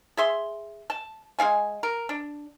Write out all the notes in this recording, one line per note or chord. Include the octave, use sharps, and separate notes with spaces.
G#4 E5 C6
A5
G#3 E4 F5 G#5
A#4
D4